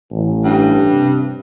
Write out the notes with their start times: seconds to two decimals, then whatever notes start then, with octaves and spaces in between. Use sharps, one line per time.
0.11 A1
0.44 G2
0.93 C3